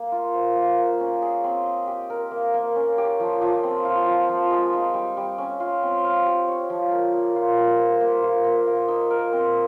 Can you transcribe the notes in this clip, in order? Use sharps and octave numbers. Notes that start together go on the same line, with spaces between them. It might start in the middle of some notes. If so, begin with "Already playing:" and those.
Already playing: A#3
F4
C5
A#3
A#3
C#4
G#4
C4
D#5
G4
A#4
A#3
A#3
C#4
G4
F3
F3
C4
F4
F3
F3
G#3
D#4
G3
G3
C#4
F4
C4
F5
G4
C#5
F3
A#4
A#3
F4
G3
C5
A#3
F4
A#3
A#3
D#4
A#4
C4